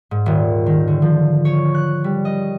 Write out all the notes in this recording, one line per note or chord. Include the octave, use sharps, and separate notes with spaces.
G#2
D#1
D#3
D3
F3
C#5
F#6
G3
D#5